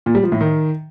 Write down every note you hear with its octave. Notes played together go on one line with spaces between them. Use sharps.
A#2
G3
F3
A2
D#3